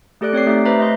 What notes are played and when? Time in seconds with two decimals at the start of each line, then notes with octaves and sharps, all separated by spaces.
0.21 A3 G4 A4 D5 F#6 D7
0.33 C4 C#5 D5 C7
0.46 A3 D#4 G4 E5
0.65 B4 C5 E5 A#5
0.79 A3 D#5 C6